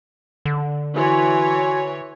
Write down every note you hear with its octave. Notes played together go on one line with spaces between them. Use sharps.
D3
E3 F#4 C#5 G#5 C6